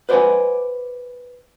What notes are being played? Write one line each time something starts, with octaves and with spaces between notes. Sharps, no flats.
B4 C5 D5 E5 F#5 G#5